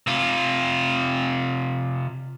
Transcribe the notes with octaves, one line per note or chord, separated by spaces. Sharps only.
C3 F4